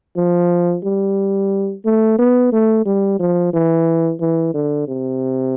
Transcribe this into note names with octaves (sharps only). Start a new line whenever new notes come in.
F3
G3
A3
B3
A3
G3
F3
E3
E3
D3
C3